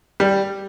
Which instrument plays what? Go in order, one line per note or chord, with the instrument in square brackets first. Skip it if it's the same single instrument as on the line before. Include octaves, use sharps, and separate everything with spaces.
[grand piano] G3